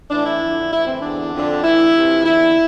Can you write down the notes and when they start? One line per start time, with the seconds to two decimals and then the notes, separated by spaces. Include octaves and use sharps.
0.10 A2 E3 D4
0.26 E4
0.41 F2 D3
0.71 A2 E3 E4
0.87 C4
1.02 E2 D3 D4
1.33 F2 D3
1.63 A2 E3 E4
1.94 F2 C3 E3
2.25 E2 D3 E4